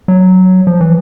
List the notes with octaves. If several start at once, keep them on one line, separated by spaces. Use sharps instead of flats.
F#3
F3
E3